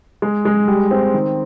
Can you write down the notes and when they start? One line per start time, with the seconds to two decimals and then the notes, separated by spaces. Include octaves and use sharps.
0.22 G#3
0.45 G#3
0.68 G3
0.91 C4
1.14 D#3